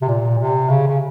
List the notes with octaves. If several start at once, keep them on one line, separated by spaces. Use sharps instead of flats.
C3
A#2
C3
C#3
C#3